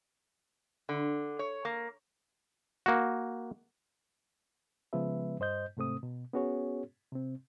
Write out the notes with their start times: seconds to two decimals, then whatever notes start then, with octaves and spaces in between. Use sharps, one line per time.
0.89 D3
1.39 C#5
1.65 A#3
2.86 A#3 F#4
4.93 C#3 F3 G#3 B3 B4 E5
5.40 G2 C5 D#5 G6
5.77 G#2 C3 A3 C4 D#6
6.03 B2
6.33 B3 C#4 F#4 G#4 C#5
7.12 C3 C4